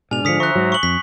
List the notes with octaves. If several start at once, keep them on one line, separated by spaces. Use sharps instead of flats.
G#2 B2 D4 G#5 F6 F7
D3 F3 D#6 B6 C#7
C5 E5 A#5 C#6 F#6
G#2 F#3
C#6 F#7
F2 B6